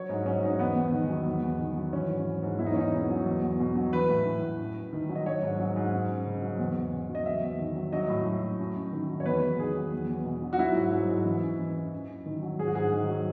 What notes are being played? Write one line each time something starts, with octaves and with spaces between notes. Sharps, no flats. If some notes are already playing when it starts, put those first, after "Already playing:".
Already playing: F#3 C#5
G#2 D#4
F#3 C#4
G#2 D#4
E2 B3
E2
D#3
F#3
E2
E2
D#3
F#3
E3 C#4
G#2
E3
G#2
E2 E4
D#4
E2 C#4
D#4
B2
F#3
E2
E2
B2
F#3
E3 B4
A2
E3
A2
F#2
F#2
D#3
F#3
D#5
F#3 C#5
G#2
F#3
G#2
F#2
F#2
C#3
F#3
E2
E2
C#3
F#3
D#5
E2 E5
E2
D#3
F#3
F#3 D#5
A2
F#3
A2
F#2
F#2
D#3
F#3
C#5
E2 B4
E2
D#3 G#4
F#3
E2
E2
B2
F#3
F#4
F#3 E4
G#2
F#3
G#2
E3
F#2
E3
F#2
F#2
F#2
D#3
F#3
G#2 G#4
F#4
G#2 G#4
D#3
F#3